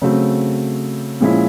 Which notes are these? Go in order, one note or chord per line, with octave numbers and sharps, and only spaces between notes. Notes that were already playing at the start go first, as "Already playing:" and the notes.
C#3 F#3 A3 C4
A#2 F3 G#3 C#4 E4